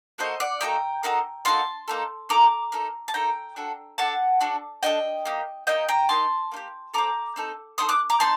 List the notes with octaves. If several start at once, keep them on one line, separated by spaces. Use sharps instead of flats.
A#3 D#4 F#4 A4 C5 D#5
D5 F#5
A#3 D#4 F#4 A4 G5 A#5
A#3 D#4 F#4 A4
A#3 D#4 F#4 A4 A5 C6
A#3 D#4 A4
A#3 D#4 A4 A#5 D6
A#3 D#4 A4
A5
A#3 D#4 A4 G5 A#5
D4 F#4 A4
D4 F#4 A4 F#5 A5
D4 F#4 A4
D4 F#4 A4 D#5 G5
A#3 D#4 G4
A#3 D#4 G4 D#5 G5
G5 A#5
A#3 D#4 G4 A5 C6
A#3 D#4 G4
C4 D#4 A4 A#5 D6
C4 D#4 A4
C4 D#4 A4 C6 D#6
D6 F#6
A#5 D6
C4 D#4 A5 C6